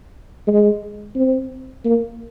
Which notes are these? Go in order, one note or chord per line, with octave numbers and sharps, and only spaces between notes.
G#3
C4
A#3